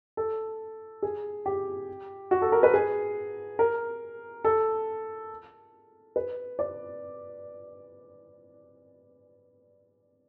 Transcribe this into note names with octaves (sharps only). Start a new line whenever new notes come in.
A4
G#4
G4
F#4
A4
A#4
B4
G#4
A#4
A4
B4
D5